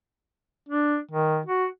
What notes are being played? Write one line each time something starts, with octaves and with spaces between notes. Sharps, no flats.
D4
D#3
F#4